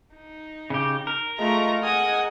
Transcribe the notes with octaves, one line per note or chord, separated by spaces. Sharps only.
D#4
C#3 G4
A#4
G#3 A3 F4 A#5 C#6
D#5 F#5 G#5 D#6